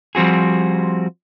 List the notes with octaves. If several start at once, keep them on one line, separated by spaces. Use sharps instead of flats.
F3 G3 C4 F#4 G#4